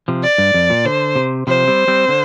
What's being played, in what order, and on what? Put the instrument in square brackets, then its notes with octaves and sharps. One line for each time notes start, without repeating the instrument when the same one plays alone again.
[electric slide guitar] C3 F3
[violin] D5
[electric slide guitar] G2
F2
A#2
[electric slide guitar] D3 [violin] C5
[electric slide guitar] C3
[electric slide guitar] C3 F3 [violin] C5
[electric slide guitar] G3 C4
G3 C4
D3